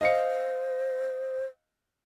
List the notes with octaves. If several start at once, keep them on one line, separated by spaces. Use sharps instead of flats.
C5 D#5 F5 C#7